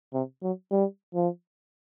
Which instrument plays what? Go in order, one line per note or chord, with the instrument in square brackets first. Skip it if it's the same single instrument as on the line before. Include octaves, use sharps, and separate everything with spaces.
[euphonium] C3
F#3
G3
F3